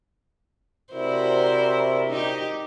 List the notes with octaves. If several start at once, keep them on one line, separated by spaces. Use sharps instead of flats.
C3 E4 F#4 A#4 C5 D5
D#4 G4